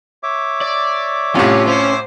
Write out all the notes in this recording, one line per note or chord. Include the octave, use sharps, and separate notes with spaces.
C#5 E5 D6
D5
C2 A2 C#4 F4 G4
C#4 C5